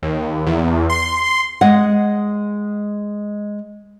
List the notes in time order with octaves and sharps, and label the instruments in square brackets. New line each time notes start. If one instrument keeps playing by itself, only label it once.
[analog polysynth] D#2
E2
C6
[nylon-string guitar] G#3 D#5 F#5